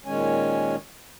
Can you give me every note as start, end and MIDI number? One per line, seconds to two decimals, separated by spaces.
0.06 0.76 46
0.06 0.76 51
0.06 0.76 56
0.06 0.76 61
0.06 0.76 73
0.06 0.76 80